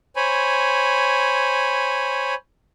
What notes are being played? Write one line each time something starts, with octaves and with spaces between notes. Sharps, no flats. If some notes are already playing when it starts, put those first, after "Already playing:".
C5 C#5 G#5 B5